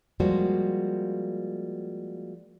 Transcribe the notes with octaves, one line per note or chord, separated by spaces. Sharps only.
F3 G3 G#3 A#3 F#4 C5